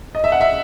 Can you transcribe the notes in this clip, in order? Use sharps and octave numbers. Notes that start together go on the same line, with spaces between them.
D#5
E5
F#5
E5